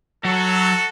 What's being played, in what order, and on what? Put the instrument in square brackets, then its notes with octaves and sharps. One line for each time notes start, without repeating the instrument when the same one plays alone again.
[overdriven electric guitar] F#3 [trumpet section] F#4 A4